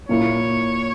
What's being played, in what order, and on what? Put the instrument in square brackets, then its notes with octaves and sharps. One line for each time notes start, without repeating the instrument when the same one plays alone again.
[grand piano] A#2 A#3 E4 [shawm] C#5